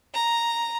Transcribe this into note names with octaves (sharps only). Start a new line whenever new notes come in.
A#5